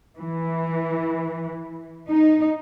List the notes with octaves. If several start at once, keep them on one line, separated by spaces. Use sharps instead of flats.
E3
D#4